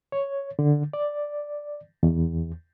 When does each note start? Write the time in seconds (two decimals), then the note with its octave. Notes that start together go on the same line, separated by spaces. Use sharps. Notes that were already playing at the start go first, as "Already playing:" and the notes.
0.12 C#5
0.59 D3
0.93 D5
2.03 E2